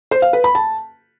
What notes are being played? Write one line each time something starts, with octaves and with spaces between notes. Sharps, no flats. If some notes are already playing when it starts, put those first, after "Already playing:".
C5
F5
B4
B5
A5